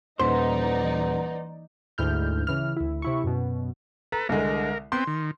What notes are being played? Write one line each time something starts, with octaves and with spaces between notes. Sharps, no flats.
D#1 E3 D#4 B4 C5 D5 F#5
D2 G#2 E4 F6 G6
C#3 E3 F6
D2 E4
C3 E4 C#6
F#2 B2
A4 B4 A#5
C2 D3 G#3 A#4
B3 C4 G5 C6
D#3